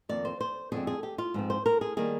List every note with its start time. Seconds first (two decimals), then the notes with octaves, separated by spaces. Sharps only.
0.09 F2 D#3 A#3 D5
0.25 C5
0.40 C5
0.72 F2 D3 G#3 C4 G#4
0.87 G#4
1.03 G4
1.18 F4
1.34 G#2 F3 C4
1.50 C5
1.66 A#4
1.81 G#4
1.97 D#3 G3 A#3 G#4